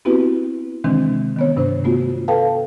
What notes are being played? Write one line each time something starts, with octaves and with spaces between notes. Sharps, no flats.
B3 C4 E4 F#4 G4 B4
C3 D#3 E3 G#3 C4 D4
D#3 B3 C#5
G2 C3 D4 C5
A3 B3 F4 F#4
A4 B4 F5 G5 A5